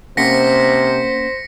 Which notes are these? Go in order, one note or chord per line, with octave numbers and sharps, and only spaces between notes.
C3 A#3 C#4 C5 F#5 A#6 B6 C#7